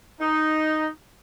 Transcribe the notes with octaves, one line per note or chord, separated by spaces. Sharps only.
D#4